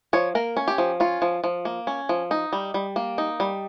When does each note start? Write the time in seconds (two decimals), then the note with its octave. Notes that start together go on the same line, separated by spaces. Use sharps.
0.13 F3 C#5
0.35 A#3 A#4
0.57 C#4
0.68 G4
0.78 F3
1.00 C#4 F4
1.22 F3
1.44 F3
1.65 A#3
1.87 C#4
2.09 F3
2.31 D#4
2.53 G3
2.74 G3
2.96 A#3
3.18 D#4
3.40 G3